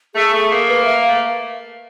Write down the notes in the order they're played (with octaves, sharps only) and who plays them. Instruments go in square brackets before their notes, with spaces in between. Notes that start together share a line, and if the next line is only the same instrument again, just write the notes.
[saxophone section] A3 [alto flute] G#4
[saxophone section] A3
A#3
[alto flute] B4
E5
F5
[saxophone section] A3